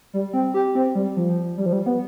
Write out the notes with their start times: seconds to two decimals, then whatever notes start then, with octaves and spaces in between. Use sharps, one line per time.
0.14 G3
0.33 C4
0.54 G4
0.75 C4
0.95 G3
1.17 F3
1.58 G3
1.66 F3
1.73 G3
1.86 B3